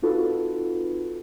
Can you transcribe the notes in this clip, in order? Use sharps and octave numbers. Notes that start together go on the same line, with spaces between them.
C4 D#4 F4 F#4 A4 B4